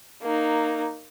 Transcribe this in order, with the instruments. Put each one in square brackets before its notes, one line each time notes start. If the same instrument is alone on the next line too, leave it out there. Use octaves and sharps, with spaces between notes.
[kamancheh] A#3 D#4